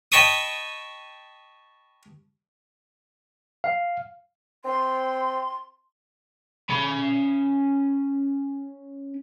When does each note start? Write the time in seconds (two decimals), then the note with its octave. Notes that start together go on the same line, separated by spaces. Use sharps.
0.12 D#5 G5 A5 B5 C#6 D#6
3.64 F5
4.65 C4 C6
6.70 C#4 B5